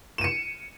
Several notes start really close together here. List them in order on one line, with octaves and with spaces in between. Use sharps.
E7 D#7 C#7